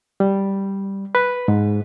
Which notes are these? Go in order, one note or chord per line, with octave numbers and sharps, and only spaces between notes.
G3
B4
G#2